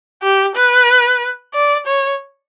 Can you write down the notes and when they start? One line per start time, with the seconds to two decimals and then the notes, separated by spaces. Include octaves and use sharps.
0.23 G4
0.55 B4
1.54 D5
1.86 C#5